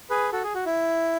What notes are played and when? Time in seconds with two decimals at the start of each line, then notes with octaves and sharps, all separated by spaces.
0.10 G#4 B4
0.32 F#4 A4
0.43 G#4
0.55 F#4
0.66 E4